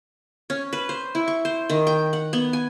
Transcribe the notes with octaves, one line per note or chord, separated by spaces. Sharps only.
C#4
B4
C5
E4
C#6
C5
D#3
G5
F#5
B3
G#5